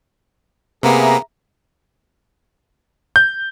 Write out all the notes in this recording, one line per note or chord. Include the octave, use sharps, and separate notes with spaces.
C3 A#3 B3 G#4 E5 A#5
G6